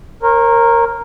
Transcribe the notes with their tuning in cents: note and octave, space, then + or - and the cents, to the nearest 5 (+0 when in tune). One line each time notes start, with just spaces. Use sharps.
A#4 +0 C#5 -40